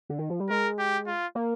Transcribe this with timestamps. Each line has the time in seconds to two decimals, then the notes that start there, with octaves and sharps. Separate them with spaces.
0.10 D3
0.19 D#3
0.30 F3
0.40 G3
0.49 G#3 A#4
0.79 G4
1.07 F4
1.35 A#3